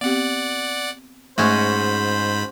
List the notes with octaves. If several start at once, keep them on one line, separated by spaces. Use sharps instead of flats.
B3 C4 G4 D5 F#5
G#2 G#3 A3 C#4 F#4 C5 B5